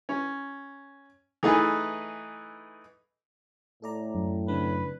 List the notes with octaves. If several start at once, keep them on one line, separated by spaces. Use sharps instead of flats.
C#4
E3 A3 D#4 G#4 B4
A2 A4 D5 A#5
F#2
C#3 C4 D4 B4